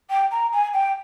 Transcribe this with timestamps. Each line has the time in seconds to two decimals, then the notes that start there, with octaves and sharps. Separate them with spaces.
0.09 G5
0.31 A#5
0.52 G#5
0.73 G5